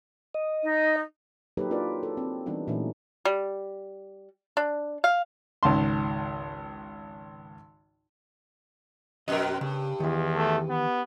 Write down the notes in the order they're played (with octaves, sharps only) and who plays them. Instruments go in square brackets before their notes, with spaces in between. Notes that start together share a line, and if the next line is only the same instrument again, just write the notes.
[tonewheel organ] D#5
[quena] D#4
[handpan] F#3 A#3 D#4 G4 A4 B4
A#3 D4 F4 A#4 B4 D5
A4
C4
E3 G3 B3 D4 D#4
A#2 E3 F#3 A3 C#4 D#4
[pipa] G3
D4
F5
[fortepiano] G#1 C#2 A5 C6
[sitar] F2 B2 A#4 [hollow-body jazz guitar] D#5
[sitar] G2 [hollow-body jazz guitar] C#3
[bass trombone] E2 [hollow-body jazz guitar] D#3 E3
[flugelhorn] A3
B3